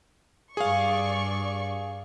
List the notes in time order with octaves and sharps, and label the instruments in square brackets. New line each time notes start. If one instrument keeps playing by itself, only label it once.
[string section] G2 D5 C#6 [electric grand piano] G#4 F5